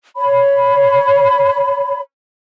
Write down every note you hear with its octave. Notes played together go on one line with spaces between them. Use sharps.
C#5 B5